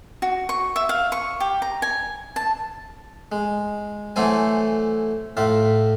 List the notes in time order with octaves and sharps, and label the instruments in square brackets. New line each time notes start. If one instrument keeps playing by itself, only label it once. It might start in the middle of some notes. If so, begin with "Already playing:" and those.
[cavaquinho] F#4
C#6
E5
F5
C#6
G4
A#5
G#5
A5
[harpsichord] G#3
E3 F#3 A3 A4 C5 G#5
A2 F4 E5